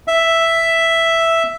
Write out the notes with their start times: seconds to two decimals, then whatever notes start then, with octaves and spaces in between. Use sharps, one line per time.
0.08 E5